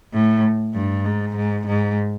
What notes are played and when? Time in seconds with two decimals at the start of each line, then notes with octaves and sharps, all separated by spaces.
0.13 A2
0.74 G2
1.05 G#2
1.36 G#2
1.67 G#2